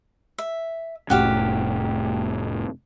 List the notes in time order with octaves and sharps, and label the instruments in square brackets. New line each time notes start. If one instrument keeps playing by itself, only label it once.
[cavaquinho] E5
[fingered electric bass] F1 A2 C#4 [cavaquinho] F#4 G4 F5